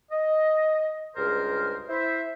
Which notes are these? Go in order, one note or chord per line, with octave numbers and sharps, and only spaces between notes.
D#5
C#2 G2 G#4 A#4 C5 F6
E4 C5 E5